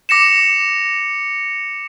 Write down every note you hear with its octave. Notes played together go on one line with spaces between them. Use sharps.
D6 A#6 C#7 E7